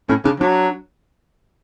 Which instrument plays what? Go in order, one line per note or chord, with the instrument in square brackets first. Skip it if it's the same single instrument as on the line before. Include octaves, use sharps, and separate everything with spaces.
[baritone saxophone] A2 [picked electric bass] C#4
[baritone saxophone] C#3 [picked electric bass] D4
[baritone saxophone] F#3 [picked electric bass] D4